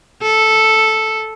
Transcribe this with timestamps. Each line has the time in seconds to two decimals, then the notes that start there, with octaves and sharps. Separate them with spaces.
0.22 A4